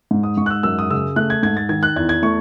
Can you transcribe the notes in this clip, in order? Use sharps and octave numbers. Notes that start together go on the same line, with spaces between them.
G#2
D#6
G#2 C#6
F#6
E6
F#2 E6
D#6
C#3 E6
A3 F#6
G#6
G#2 G#6
A6
D#3 G#6
F#6
E2 G#6
G#6
A3 C#6